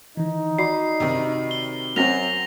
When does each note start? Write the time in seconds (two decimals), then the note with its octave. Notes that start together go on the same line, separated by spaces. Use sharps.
0.17 D#3 E3 D#4
0.59 F#4 D5 B5 C7
1.00 C3 D#3
1.51 G7
1.96 F#2 F#3 C4 A#6 F7